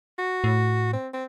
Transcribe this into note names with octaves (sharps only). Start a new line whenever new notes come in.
F#4
A2
C4
C4